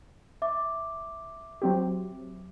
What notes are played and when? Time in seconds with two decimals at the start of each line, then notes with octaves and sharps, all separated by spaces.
0.42 E5 D6
1.62 F#3 C4 G4